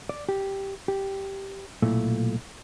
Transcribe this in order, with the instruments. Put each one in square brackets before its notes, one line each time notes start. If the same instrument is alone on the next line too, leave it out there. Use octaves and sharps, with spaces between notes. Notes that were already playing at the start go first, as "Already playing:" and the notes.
[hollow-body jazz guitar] D5
G4
G4
B1 A#2 A3 E4